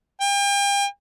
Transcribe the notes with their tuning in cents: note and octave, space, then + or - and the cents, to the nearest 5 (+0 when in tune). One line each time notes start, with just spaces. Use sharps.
G5 +40